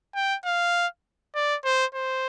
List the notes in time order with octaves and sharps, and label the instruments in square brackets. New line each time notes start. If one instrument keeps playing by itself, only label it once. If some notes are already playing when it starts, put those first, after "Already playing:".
[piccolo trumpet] G5
F5
D5
C5
C5